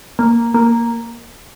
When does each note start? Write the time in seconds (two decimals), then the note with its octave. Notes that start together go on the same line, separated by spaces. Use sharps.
0.19 A#3
0.54 A#3